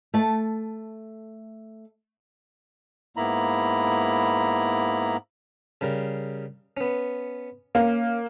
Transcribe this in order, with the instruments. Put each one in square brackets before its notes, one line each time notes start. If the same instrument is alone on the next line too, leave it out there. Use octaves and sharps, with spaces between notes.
[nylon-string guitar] A3 A5
[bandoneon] G#2 A#3 B3 E4 A#5 B5
[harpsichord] C#3 G3 A#4
B3 C#4
[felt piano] A#3 [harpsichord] C#4